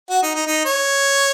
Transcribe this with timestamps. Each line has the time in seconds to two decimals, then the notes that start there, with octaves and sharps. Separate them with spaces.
0.10 F#4
0.23 D#4
0.35 D#4
0.46 D#4
0.65 C#5